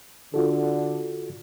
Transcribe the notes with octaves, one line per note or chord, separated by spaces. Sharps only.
D3 F4 F#4 A4